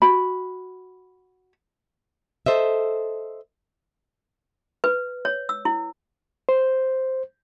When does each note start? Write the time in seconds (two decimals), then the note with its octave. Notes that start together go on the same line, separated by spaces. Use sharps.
0.02 F#4 B5
2.46 A4 C5 D#5 E5
4.84 B4
5.25 C#5
5.49 E6
5.65 E4
6.49 C5